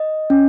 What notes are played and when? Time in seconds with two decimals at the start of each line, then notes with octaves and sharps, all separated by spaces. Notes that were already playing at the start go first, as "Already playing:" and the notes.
Already playing: D#5
0.30 C#4